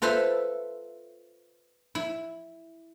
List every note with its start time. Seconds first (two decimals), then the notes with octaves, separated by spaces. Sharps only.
0.02 F4 A4 B4 C5 E5
1.95 E4